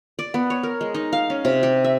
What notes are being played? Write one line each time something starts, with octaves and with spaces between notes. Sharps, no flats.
D5
B3
C#5
A#4
G#3
D#4
F5
C#4
C3
G4
E5